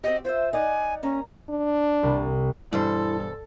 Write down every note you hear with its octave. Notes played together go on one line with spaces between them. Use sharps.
C4 F#4 G4 D#5
F4 C5 E5
D#4 D5 F#5 G#5
A#3 C#4 A#5
D4
C2
E2 G2 B2 E4 A4 C5